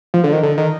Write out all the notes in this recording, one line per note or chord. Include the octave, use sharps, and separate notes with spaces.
F3
D3
D#3
D3
D#3